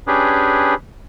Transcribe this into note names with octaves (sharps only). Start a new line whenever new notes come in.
C#4 D4 G4 G#4 B4